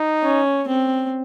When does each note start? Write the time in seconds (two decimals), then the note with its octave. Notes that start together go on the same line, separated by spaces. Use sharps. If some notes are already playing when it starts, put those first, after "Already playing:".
Already playing: D#4
0.23 C#4
0.68 C4